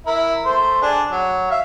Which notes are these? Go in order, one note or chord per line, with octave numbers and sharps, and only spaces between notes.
E4 A#4
A3 C5
D4 G#4
F#3
E5 F5